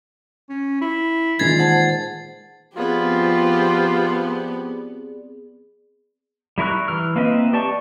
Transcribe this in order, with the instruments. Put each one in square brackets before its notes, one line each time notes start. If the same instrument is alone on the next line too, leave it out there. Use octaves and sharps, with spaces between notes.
[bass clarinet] C#4
E4
[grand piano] A#2 D#3 G#3 [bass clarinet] E3 [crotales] G#6 A6 C7
[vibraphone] C5 F#5 A5
[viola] F3 G4 [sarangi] B3 [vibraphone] C4 G#4 D5 [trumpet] F4
[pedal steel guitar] G3 E4 A#4 C#6 F#6
E3 F6
A#3 C4 B4 D#5 E5
G4 D5 A5 C#6